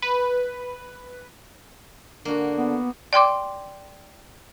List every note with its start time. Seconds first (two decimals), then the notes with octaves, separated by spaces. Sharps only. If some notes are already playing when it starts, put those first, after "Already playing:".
0.02 B4
2.25 D3 A#3 D4 F#4
2.57 B3
3.13 D5 G5 C6 D6